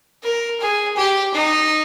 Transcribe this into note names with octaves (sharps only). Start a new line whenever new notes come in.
A#4
G#4
G4
D#4